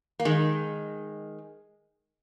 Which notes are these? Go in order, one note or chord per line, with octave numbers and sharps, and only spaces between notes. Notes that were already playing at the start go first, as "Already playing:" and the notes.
A#3
D#3 G#3